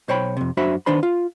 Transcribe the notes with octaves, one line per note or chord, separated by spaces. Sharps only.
B1 C5 C#5 G5 B5
F2 C3
F#2 D4 F#4 C5 E5 B5
D#3 B3 D4 C5 B5
F4